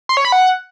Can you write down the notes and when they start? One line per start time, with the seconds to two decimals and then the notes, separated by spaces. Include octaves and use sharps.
0.09 C6
0.17 C#5
0.25 B5
0.32 F#5